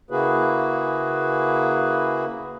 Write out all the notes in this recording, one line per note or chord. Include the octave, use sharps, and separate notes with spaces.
C#3 A#3 E4 F#4 G#4 B4